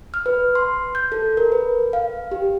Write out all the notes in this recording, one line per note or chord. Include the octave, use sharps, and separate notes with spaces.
F6
B4
C6
G6
A4
A#4
B4
F5
G4